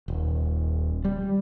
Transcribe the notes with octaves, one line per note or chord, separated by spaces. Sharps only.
D#1
G3